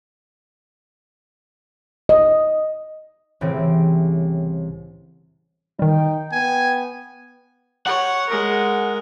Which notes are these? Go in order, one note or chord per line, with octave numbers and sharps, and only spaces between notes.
D#5
C2 A2 C#3 E3 C4 G5
D#3 G3 D#4 G5
B3 G#5
C#5 F#5
G#3 A#4